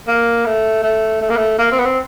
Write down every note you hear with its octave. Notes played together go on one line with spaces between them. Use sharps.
A#3
A3
A3
A3
A#3
A3
A#3
C4
B3
C4